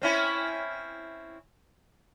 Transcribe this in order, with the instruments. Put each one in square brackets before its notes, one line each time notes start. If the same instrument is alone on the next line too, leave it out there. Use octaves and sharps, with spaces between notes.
[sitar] C4 C#4 E4